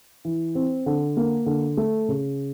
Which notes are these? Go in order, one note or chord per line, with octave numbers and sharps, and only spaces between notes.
E3
C4
D3
A#3
D3
A3
C#3